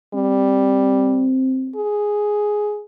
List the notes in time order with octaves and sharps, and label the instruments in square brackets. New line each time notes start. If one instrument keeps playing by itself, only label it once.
[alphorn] G3 [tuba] C4
[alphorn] G#4